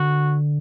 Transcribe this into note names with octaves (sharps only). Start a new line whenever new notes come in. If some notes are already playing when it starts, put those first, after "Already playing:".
Already playing: D3 F#4